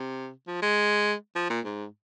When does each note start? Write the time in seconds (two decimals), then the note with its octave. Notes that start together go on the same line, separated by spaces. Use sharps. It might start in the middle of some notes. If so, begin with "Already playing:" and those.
Already playing: C3
0.48 F3
0.62 G#3
1.35 F3
1.50 A#2
1.65 G#2